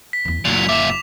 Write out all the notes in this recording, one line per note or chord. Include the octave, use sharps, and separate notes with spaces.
B6
E2 E3
F#1 A#2 F#3 E4 F7
A#2 E5 D6 F7